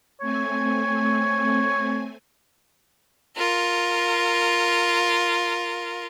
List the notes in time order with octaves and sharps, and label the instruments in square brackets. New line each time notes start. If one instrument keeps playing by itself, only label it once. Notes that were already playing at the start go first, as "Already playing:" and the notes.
[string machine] A3 C4 G#5 [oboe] C#5
[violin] F4 A#4